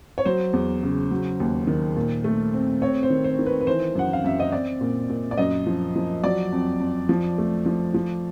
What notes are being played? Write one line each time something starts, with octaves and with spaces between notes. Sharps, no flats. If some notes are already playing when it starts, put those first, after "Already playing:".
C#5
F#3 C5
E2
C#3
F#3
D#2
D#3
A#2
A3
C4
C4 C#5
C5
D#3
C5
D#3
B4
B4
E3 C5
F#2 F#5
F5
F#2 E5
D#5
C4 D5
A#2
A#2
D5
F#2 D#5
F3
F3
F#3 D5
F2
F2
F3
A3
F3
F3